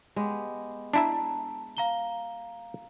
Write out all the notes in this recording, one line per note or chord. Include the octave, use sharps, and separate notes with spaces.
G#3 B3 G4
D4 E4 E5 A5 A#5
F5 A#5 G7